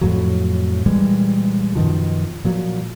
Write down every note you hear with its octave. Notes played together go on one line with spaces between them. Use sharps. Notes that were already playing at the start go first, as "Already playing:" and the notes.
F2 A2 F3 F#3
A#2 E3 G3 G#3
F#2 B2 D#3 F3
A#2 F3 F#3